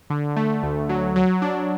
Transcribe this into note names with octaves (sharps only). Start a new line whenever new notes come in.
D3
A3
D2
F#3
F#3
D4